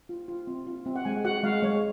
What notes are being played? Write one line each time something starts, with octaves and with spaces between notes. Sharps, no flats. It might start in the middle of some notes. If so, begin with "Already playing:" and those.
F4
F4
C4
F4
C4
F#5
G#3 G#5
F#4 F#5
G#3 F5
G#3 C#5